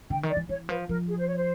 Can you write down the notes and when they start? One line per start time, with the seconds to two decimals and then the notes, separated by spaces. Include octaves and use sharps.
0.10 D3 G5
0.23 D#3
0.29 D5
0.37 E3
0.49 E3 C#5
0.69 F3 B4
0.89 F3 A#4
1.08 G#4
1.18 C5
1.27 C#5
1.36 C5